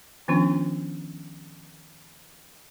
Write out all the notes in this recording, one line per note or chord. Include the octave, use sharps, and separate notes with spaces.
D#3 F3 B3 C#4 D4 F4